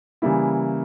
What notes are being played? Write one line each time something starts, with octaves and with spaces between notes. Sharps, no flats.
C#3 E3 G3 A#3 E4